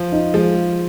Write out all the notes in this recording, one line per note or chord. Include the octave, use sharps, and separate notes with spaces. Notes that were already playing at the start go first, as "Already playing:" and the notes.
Already playing: F3
D#4
F3 G#3